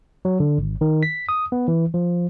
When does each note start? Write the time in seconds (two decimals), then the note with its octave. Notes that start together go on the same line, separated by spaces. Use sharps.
0.25 F#3
0.40 D3
0.58 G#1
0.81 D#3
1.03 B6
1.29 D#6
1.52 B3
1.68 E3
1.94 F3